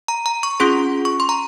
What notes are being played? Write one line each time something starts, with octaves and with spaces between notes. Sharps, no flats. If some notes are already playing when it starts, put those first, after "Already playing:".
A#5
A#5
C#6
C#4 F4 G#4 C6
C#6
C6
A#5